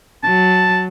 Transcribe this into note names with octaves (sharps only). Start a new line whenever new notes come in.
F#3 A5